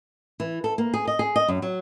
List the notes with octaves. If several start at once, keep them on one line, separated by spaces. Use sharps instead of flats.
E3
A4
A#3
G#4
D#5
G#4
D#5
F#2
F#3